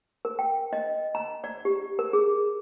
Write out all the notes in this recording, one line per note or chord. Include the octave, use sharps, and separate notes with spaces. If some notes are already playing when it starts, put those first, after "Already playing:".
A#4
G5
D#5
A#5
D5
G4
A#4
G#4